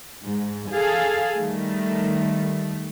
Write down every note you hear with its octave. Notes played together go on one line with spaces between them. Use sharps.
G#2
G#4 A4 F5
D#3 G3 A3